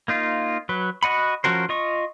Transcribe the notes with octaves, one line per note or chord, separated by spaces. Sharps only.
A#3 D#4 F4
F#3 B4
F#4 D#5 F#5 B5
F3 C#4 F#4 A#4 C5
F4 D#5 C#6